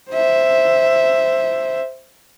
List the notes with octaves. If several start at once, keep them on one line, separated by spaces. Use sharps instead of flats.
C5 E5